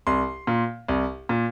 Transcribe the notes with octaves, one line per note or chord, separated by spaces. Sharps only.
C2 C6
A#2
C2
A#2